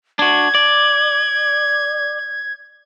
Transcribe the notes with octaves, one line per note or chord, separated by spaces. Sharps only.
D4 F#4 G#6
D5